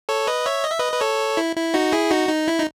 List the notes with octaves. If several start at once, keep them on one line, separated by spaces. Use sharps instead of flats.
A4 C#5
B4 D#5
C#5 E5
D#5
E5
B4 D#5
B4
A4 C#5
E4
E4
D#4 F#4
E4 G#4
D#4 F#4
D#4
E4
D#4